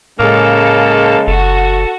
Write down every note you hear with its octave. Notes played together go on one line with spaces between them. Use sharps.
A2 C#3 G#3 A#3 A4
F#1 F#4 A4